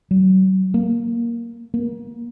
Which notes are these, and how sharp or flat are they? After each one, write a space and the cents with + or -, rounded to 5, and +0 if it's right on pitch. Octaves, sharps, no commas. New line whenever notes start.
F#3 +40
A#3 +5
A#3 +30